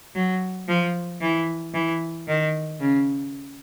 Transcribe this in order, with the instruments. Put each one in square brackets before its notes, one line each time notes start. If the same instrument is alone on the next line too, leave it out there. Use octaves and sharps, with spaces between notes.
[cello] F#3
F3
E3
E3
D#3
C#3